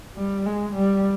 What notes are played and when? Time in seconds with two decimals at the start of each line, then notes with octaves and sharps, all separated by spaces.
0.16 G3
0.46 G#3
0.74 G3